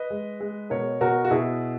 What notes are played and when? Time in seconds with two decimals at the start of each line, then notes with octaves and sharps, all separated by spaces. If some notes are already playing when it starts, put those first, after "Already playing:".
Already playing: B4 D#5
0.10 G#3
0.40 G#3
0.70 B2 A#4 C#5
1.01 B2 F#4 A#4
1.25 F#4
1.30 B2 E4 G#4